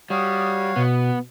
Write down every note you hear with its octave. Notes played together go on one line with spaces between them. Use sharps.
G3 F#4 C#5 F5 D#6
B2 B3